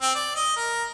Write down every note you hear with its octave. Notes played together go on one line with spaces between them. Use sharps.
C4
D5
D#5
A#4